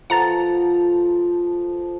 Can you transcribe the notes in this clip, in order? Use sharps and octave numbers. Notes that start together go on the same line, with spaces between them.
F3 A4 B4 F#5 A#5 A6